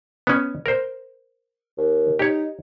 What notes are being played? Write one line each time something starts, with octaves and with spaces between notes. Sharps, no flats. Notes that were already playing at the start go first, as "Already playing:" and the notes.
B3 C#4
A#4 C5
D#2
D#4 G4 C#5